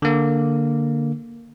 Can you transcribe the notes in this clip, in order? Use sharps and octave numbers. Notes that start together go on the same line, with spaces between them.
D3 A#3